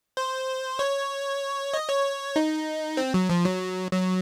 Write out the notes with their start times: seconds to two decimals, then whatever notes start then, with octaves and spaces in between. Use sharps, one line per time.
0.17 C5
0.79 C#5
1.74 D#5
1.89 C#5
2.36 D#4
2.97 C4
3.14 F#3
3.30 F3
3.45 F#3
3.91 F#3